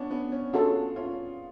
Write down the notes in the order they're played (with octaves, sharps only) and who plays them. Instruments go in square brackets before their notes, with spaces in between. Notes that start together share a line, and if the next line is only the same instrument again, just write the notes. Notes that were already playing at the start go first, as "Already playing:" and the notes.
Already playing: [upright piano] B3 C#4 D4
B3
C#4
[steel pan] C#4 F#4 A4 [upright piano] F4 G#4
[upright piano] C#4 F4